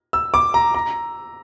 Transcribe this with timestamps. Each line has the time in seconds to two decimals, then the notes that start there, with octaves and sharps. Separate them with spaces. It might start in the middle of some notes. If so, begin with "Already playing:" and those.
0.13 E6
0.34 D6
0.54 A#5
0.74 A#5